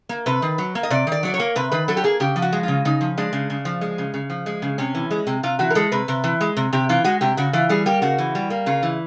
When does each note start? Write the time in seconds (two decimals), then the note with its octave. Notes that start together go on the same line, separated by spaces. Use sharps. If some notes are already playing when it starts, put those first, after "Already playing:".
0.09 A#3
0.26 C3 B4
0.42 D#3
0.58 F#3
0.75 A#3
0.83 D#5
0.90 C3 D5
1.07 D#3 D5
1.23 F#3 D5
1.34 C#5
1.40 A#3
1.56 C3 B4
1.72 D#3 B4
1.88 F#3 A4
1.97 G4
2.04 A#3 G#4
2.20 C#3 G4
2.36 F3
2.42 F#4
2.52 G#3
2.63 C#3 F4
2.85 C#3 D#4
3.01 F3
3.18 G#3 D4
3.33 C#3
3.50 C#3
3.65 F3
3.81 G#3
3.98 C#3
4.14 C#3
4.30 F3
4.46 G#3
4.62 C#3
4.78 C3 C#4
4.95 E3
5.11 G#3
5.27 C3
5.43 C3 F4
5.59 E3 F#4
5.70 A#4
5.75 G#3 A4
5.92 C3 B4
6.08 C3
6.24 E3
6.41 G#3
6.57 C3
6.73 C3 G4
6.89 E3 F4
7.04 G#3 F#4
7.21 C3 G4
7.37 C#3 F#4
7.53 E3 F4
7.69 G3 G#4
7.86 A#3 G4
8.02 C#3 F#4
8.18 E3
8.35 G3
8.50 A#3
8.66 C#3 F4
8.83 E3